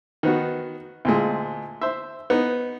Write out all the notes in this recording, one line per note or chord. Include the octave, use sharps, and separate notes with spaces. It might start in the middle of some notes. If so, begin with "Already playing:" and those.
D#3 B3 F#4
D2 A#2 G#3
C5 E5
B3 D#4